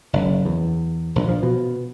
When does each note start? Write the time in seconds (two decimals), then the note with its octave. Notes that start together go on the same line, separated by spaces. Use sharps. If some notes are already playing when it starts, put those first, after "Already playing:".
0.13 F#1
0.45 E2
1.16 A#1
1.28 F3
1.43 B2